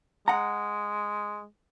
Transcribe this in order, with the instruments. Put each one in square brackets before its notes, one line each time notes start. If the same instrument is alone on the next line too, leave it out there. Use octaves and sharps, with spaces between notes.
[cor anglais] G#3 [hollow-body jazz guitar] F#5 A#5